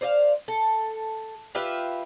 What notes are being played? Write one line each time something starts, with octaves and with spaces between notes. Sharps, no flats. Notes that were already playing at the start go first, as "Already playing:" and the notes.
C5 D5 D#5 F5
A4
F4 G4 B4 E5